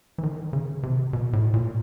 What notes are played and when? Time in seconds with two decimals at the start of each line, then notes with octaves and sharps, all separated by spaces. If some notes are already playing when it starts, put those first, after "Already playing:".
0.18 E3
0.23 D#3
0.53 C#3
0.83 C3
1.13 B2
1.33 A2
1.54 A#2